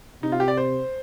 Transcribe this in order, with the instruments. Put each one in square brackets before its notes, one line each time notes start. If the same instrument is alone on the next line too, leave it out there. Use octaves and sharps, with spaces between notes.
[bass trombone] C3 [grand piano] D#4
[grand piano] F4
G4
D5
C5